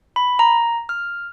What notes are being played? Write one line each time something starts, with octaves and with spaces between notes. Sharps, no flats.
B5
A#5
F6